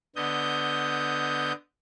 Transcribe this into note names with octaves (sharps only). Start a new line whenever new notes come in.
D3 B3 D#5 G6